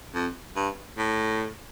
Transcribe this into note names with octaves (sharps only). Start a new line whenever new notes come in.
F2
G2
A2